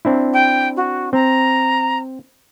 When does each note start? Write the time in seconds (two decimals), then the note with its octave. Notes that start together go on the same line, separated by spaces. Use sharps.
0.05 C4 D4 E4
0.33 G5
0.76 F#4
1.13 C4 A#5